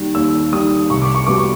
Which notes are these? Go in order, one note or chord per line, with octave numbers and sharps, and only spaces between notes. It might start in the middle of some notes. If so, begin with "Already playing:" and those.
Already playing: D#2 D#3 G3
D#2 E6
D#3 G3 D#6
C2 C#6
D6
C#6
B2 G3 B3 D6
C#6